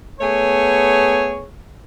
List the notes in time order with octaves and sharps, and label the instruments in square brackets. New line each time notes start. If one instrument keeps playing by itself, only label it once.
[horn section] A3 B3 G#4 C#5